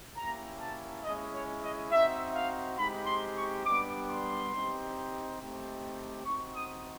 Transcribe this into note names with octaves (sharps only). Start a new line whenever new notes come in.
A#3 C#4 E4 G4 A#5
A5
G#3 C#4 E4 D#5
C#5
D#5
C4 D#4 F#4 E5
F5
G#3 C4 D#4 G4 B5
C6
C#6
G3 B3 D4 G4 D6
C6
C4 D#4 G4
A3 C4 D#4 G4
C4 D#4 F#4 C#6
D#6